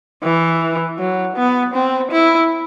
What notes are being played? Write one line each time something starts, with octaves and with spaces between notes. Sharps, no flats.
E3
F#3
B3
C4
E4